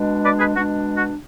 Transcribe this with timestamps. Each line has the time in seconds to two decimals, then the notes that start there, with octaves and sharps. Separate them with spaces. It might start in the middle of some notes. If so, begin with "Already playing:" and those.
Already playing: B2 G#3 D4
0.24 B4 D5
0.39 G#4 B4
0.55 B2 G#3 D4 F#4
0.96 F#4